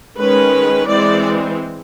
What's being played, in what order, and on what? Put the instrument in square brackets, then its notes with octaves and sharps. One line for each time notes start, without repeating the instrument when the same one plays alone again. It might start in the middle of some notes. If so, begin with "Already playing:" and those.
[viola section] D#3 G#3 C#4 B4
E3 G#3 C4 D5